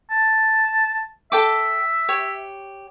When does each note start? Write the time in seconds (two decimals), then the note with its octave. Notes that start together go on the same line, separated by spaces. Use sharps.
0.11 A5
1.32 A4 E5 G5 D6
2.09 G4 C#5